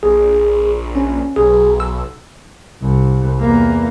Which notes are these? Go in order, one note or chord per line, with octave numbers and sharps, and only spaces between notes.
A#1 G#4
C#4
B1 G#4
E6
C2
E2 A#3